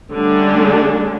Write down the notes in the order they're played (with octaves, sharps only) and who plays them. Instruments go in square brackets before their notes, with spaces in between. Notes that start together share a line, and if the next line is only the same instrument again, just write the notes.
[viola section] D3 G3 A3 C#4 D4